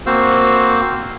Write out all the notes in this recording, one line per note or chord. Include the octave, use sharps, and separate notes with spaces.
A#3 C4 F#4 C5 F5 E6